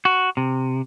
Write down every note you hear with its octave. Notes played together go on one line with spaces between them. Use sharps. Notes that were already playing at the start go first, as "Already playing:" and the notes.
F#4
C3